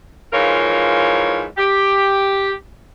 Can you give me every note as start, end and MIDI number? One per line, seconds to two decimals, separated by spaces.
0.32 1.44 44
0.32 1.44 52
0.32 1.44 53
0.32 1.44 65
0.32 1.44 70
0.32 1.44 73
1.57 2.51 67